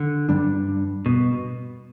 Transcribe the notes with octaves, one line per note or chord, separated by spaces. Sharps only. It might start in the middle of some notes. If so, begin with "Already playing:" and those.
Already playing: D3
G2 G3 D4
B2